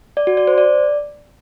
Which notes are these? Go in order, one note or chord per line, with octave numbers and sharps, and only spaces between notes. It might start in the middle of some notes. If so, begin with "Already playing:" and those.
D5
F#4
D5
C5
D5